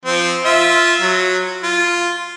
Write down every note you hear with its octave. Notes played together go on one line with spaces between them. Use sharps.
F3 C4
F4 E5
F#3
F4